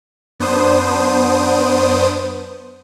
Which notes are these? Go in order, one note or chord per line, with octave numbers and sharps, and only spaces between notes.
F#2 B3 D4 C5 D#6